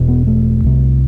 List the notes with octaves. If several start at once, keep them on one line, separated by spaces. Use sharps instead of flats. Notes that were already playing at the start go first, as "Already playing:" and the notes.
Already playing: E1 E2 B2
B3
A3
C2 C3